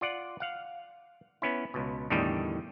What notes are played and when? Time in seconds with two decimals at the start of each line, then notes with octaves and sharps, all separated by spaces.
0.01 F4 D5 F#5
0.40 F5 F#5
1.42 B3 C#4 E4
1.74 C#2 B2
2.10 E2 A2 D3 D#3 G3 D#5